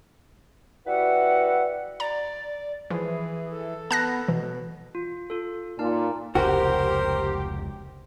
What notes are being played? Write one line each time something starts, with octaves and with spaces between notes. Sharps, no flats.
G3 E4 F#4 B4 E5 F#5
D5 A#5
E3 F3 G#4
A4
B3 A5 F#6 A#6
B2 E3
F4
F4 A4
A#2 D#4 A5
F1 C#2 F#4 G4 A#4 C5